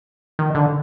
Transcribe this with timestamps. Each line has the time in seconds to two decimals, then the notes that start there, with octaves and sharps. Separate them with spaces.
0.39 D#3
0.55 D3